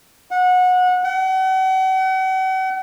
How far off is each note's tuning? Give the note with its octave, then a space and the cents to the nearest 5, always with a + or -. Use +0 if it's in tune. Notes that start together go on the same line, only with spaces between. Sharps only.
F#5 -25
F#5 +40